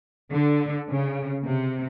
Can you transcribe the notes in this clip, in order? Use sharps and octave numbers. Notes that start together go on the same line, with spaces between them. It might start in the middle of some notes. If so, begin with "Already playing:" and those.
D3
C#3
C3